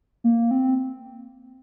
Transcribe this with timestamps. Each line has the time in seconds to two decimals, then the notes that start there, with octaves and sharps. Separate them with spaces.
0.24 A#3
0.51 C4